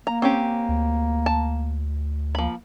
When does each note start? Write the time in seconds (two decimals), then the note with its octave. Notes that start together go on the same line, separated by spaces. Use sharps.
0.07 A#3 A#5
0.22 C4 C#4 G4
0.69 D2
1.26 A5
2.35 F3 A#3 B5